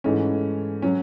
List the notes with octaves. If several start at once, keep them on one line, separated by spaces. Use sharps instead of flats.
G#2 E3 A3 C#4
F#3 C#4